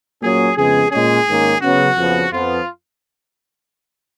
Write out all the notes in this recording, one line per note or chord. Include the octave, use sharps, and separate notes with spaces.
A#2 F#3 C#4 G#4
F2 C#3 G#3 B3 G#4
A#2 G#3 C#4 G#4
G#2 D#3 A#3 C#4
C#3 F#3 B3 F#4
F2 C#3 F3 B3
F2 F3 B3 F4